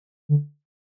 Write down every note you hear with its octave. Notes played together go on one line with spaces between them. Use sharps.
D3